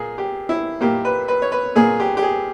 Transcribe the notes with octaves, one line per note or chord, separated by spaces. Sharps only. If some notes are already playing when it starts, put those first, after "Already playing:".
Already playing: A#2 A#3 G#4
G4
E4
A#2 A#3 G4
B4
B4
C#5
B4
A#2 A#3 G#4
G4
G4
G#4